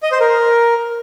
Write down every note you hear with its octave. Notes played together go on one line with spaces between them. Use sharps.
D#5
C5
A#4